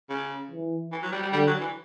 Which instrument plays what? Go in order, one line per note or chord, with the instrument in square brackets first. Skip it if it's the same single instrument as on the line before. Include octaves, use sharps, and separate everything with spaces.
[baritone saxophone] C#3
[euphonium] E3
[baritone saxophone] E3
F#3
G3
G3
[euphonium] D3 [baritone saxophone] G3
[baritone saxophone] F#3
E3